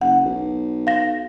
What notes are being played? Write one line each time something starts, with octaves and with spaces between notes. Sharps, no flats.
F#1 F#5
B1
F5 A#6